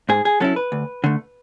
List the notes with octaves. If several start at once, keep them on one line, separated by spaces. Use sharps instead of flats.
G#2 G#4
G#4
F#3 C#4 E4 A4
B4
D2
D3 A3